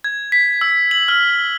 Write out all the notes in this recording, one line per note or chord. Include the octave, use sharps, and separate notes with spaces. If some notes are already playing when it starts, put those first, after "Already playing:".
G#6
B6
E6
F#7
F6